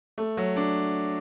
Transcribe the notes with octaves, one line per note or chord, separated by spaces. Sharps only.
A3
F#3
D4